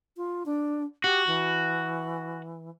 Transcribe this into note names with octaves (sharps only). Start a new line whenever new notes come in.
F4
D4
F#4 G4
E3